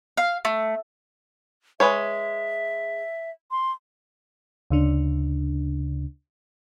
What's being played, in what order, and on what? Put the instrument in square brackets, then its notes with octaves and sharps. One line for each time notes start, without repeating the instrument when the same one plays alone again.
[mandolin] F5
A3
[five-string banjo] G#3 B4 C#5 [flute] E5
[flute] C6
[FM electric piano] D2 C#3 D4